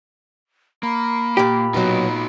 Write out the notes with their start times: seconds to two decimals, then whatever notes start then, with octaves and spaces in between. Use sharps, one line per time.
0.83 A#3 B5
1.37 A#2 G4
1.74 B2 F#3 D#4 F#4